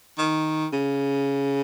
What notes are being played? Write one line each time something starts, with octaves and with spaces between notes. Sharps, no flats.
D#3
C#3